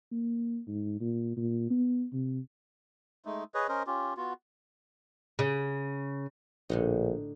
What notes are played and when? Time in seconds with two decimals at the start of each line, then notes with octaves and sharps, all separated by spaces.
0.12 A#3
0.68 G#2
1.01 A#2
1.37 A#2
1.70 B3
2.13 C3
3.25 G#3 A3 D#4
3.54 G#4 B4 C#5 D#5
3.69 C#4 A#4 C5 D#5
3.87 C#4 F4 G4
4.17 B3 F4 F#4
5.39 C#3
6.69 A#1 A2 D3 D#4